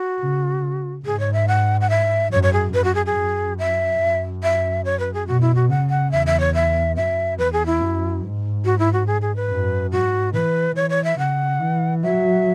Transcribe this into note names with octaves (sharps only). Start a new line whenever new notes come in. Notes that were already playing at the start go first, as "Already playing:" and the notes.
Already playing: F#4
C#3
G#2 G#4
C#5
E5
F#5
F#5
E5
F#2 C#5
C#5
G#4
F#2 B4
F#4
G#4
G#4
F#2
E5
F#2
E5
C#5
B4
G#4
B2 F#4
E4
F#4
C#3 F#5
F#5
E2 E5
E5
C#5
E5
F#2 E5
E2 B4
G#4
E4
F#2
G#2
F#4
E4
F#4
G#4
G#4
B4
F#2
G#2 F#4
E3 B4
E3 C#5
C#5
E5
C#3 F#5
E3
F#3 E5